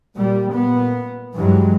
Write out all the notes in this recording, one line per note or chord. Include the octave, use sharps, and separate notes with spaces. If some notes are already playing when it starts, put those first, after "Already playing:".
A#2 G3
A#2 B3
G2 E3 F#3 G#3